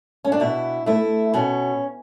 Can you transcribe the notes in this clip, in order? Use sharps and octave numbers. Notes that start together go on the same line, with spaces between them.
C#4
D4
B2 E4
A3 E4
B2 C#4